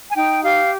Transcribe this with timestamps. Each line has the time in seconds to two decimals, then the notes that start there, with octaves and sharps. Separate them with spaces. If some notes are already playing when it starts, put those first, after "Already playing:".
0.10 G#5
0.16 D#4 G5
0.44 G4 F5